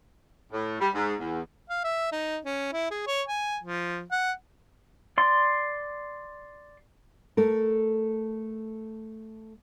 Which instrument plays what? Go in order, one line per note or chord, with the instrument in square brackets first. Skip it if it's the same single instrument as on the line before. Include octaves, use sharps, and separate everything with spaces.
[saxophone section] A2
G3
G#2
E2
[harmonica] F5
E5
D#4
C#4
E4
G#4
C#5
G#5
F3
F#5
[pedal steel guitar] D5 C6
[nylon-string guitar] A3 A4 A#4